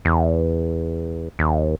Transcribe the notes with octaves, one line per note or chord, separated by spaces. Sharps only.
E2
D#2